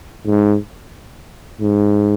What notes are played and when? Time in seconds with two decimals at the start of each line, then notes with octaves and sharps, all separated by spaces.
0.26 G#2
1.61 G#2